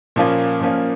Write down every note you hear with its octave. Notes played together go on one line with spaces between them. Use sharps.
A#2 F3 A#3 C#4 F4
A#2 F3 A#3 C#4 F4